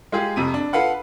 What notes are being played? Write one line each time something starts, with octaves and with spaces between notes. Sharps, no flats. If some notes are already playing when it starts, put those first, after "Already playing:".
G#3 F4 G4 G#4
F2 C3 D#7
D4
F4 A4 B4 F5 F#5